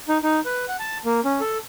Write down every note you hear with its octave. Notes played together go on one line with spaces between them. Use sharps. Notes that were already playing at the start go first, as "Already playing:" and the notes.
D#4
D#4
B4
F#5
A5
A#3
C#4
A4